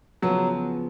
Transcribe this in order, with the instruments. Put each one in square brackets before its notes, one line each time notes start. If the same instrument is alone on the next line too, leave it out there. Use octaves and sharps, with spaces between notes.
[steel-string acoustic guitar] C#3 F3 B3 [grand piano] F#3